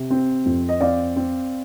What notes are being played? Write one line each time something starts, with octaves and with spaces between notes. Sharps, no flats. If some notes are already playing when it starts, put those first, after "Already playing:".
Already playing: C3
C4
F2
D#5
C4 D5 F5
C4